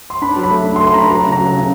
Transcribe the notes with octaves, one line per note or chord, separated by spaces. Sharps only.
C6
D4 B5
F#3
B5
A3
D4 B5
C6
A3
C6
D4 A#5 B5
F#3 A#5
C#3
A#5
F#3
C#3